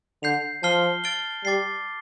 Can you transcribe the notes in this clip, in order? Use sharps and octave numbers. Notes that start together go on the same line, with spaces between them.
D3 G6 C7 F7
F3 A5 F6 C7 G7
F6 A6 D7 G7
G3 D6 A6 C7